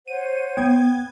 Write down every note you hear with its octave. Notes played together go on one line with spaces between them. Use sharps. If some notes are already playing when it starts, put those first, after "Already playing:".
C5 C#5 F#5 D#7
B3 G5 G#6